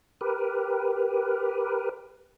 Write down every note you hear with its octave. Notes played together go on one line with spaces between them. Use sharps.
G4 A#4 B4